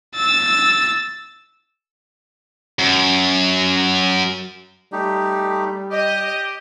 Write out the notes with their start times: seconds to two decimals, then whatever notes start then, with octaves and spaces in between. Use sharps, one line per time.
0.15 E6 A6
2.79 F#2
4.92 G3 A3 D#4 G4
5.92 G4 D#5 D#6